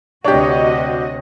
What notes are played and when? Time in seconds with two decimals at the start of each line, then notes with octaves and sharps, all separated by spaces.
0.25 D2 C3 D4 F#4 G4 C#5 D#5 G5